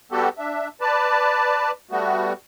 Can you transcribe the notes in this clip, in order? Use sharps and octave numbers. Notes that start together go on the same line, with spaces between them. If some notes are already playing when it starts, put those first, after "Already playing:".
G3 B3 F#4 G4 A4
D4 E5
B4 D5 A5
G3 A3 B3 F#4